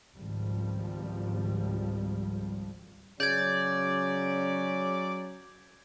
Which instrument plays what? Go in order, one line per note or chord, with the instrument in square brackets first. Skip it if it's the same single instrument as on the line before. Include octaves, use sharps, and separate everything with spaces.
[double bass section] G#1 C#2 F3 G3
[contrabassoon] C#3 [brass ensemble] F#3 C#4 [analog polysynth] D5 [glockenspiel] G6 G#6